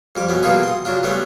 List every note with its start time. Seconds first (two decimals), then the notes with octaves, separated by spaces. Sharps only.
0.16 F2 G3 D6
0.29 B2 B3 C#4
0.43 B2 E3 G3 A#3 F4 G#4
0.63 C6 D#6
0.85 C#3 F#3 D4 F4
1.03 G3 A3 B3 C#4 D4